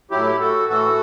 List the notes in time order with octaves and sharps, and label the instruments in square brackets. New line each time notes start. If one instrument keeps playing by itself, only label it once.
[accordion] A2 F#3 E4 G4
F#4 A4
A2 E3 F#4 A4